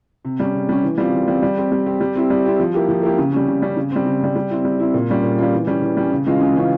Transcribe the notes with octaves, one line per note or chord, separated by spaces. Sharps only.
C3
G3 C#4
C3
G3 C#4
E3
G3 C4 F4
E3
G3 C4 F4
G3
C4 G4
G3
C4 G4
G3
C4 E4 G4
G3
C4 E4 G4
F3
A#3 E4 G4
F3
A#3 E4 G4
C#3
G3 C#4
C#3
G3 C#4
C#3
G3 C4
C#3
G3 C4
G3
C4 E4
G3
C4 E4
A#2
G3 C#4 F4
A#2
G3 C#4 F4
E3
G3 C#4
E3
G3 C#4
C#3
E3 G#3 C#4 F4
C#3
E3 G#3 C#4 F4